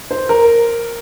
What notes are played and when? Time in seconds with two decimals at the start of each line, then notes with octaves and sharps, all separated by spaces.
0.11 C5
0.29 A#4